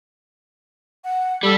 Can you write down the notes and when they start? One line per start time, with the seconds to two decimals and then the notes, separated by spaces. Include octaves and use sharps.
1.04 F#5
1.43 G3 A4